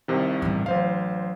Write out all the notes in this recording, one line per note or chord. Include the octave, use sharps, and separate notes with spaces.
C2 C3 D#3
A1 G2
A1 F#3 C5 F5